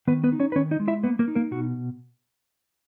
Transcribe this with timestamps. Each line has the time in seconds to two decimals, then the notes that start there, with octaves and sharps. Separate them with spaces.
0.07 D#3 B3 B4
0.24 B3 B4
0.32 D#4
0.40 C#4 C#5
0.52 B4
0.56 D#3 C#4 C#5
0.71 D#4 D#5
0.80 G#3
0.88 E4 E5
1.03 A#3 B3 B4
1.19 A#3 A#4
1.28 D#4
1.35 A#3 A#4
1.51 B2 F#4